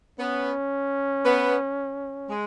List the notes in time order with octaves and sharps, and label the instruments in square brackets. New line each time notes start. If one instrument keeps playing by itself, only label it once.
[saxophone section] B3 [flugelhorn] C#4
[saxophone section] B3
G#3